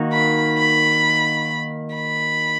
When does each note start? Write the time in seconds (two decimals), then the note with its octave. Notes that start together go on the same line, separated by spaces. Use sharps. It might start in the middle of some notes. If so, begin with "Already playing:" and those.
Already playing: D#3 A#3 D#4 F#4
0.13 B5
0.58 B5
1.95 B5